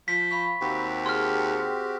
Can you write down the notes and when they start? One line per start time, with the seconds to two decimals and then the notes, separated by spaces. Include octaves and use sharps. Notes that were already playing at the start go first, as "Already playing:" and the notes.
0.08 F3 B6
0.31 F5 B5 C#6
0.61 D#2 C4 F#4 G4
1.06 G#4 C6 F6